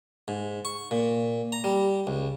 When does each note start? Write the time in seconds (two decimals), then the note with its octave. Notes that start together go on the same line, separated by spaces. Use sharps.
0.28 G#2
0.65 C#6
0.91 A#2
1.52 A#5
1.64 G3
2.07 C#2